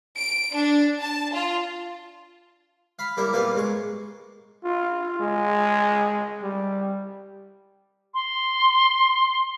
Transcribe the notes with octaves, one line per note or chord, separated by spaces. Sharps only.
D7
D4
A5
F4
F5 B5
G3 A#3 E4 E5
A#2 G3 A#3 B3 F5
G#2 G#3 C#6
F4
G#3
G3
C6